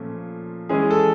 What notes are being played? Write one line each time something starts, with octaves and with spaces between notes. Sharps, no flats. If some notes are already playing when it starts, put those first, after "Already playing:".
Already playing: A#2 F3 A3 C#4
E3 G#3 C#4 G#4
A4